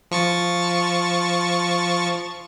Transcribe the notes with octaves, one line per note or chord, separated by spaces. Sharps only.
F3 C#6 A6